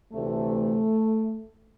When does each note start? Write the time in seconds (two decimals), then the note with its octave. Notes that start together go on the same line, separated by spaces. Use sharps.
0.13 D2 C3 E3 A3